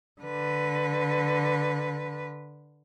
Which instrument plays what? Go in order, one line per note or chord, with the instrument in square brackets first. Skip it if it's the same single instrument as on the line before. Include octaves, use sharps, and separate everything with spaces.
[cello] D3 B4